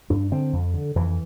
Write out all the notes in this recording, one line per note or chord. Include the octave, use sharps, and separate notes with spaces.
G2 D4
D3 C4
F2
D3
F2 E3